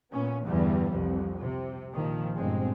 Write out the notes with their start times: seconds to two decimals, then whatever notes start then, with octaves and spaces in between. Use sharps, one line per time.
0.13 A#2 B3 C#4
0.46 E2 G2 D3 E3 G3
0.91 C2 F2
1.41 C3
1.92 A#1 A#2 D#3 F3
2.36 G1 A#2 G#3 C4